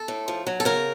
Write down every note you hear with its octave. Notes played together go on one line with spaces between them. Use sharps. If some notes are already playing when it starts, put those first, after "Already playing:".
Already playing: A4
A2
F3
F#3
A4
C#3 A#4